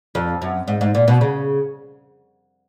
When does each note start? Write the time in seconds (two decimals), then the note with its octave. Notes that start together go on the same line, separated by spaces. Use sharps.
0.15 F2
0.42 F#2
0.68 G#2
0.81 G#2
0.95 A#2
1.08 B2
1.21 C#3